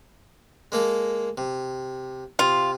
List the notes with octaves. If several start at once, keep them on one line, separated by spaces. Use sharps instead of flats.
G#3 A#3 A4
C3
C3 F4